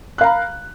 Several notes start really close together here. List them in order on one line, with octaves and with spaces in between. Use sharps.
F#6 F5 A#5 B5